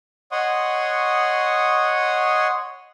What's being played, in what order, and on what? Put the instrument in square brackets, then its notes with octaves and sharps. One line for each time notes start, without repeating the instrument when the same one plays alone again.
[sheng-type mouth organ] C#5 D#5 F#5 C6 C#6 D#6